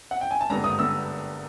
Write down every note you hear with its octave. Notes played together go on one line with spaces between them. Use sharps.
F#5
G5
G#5
A5
G#1 G2 D3 G3 B3 A#5
D#6
D3 G3 B3 E6